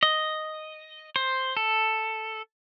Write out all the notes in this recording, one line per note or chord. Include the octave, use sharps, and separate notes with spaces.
D#5
C5
A4